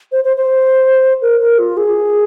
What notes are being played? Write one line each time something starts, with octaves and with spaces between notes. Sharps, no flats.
C5
C5
C5
A#4
A#4
F4
G#4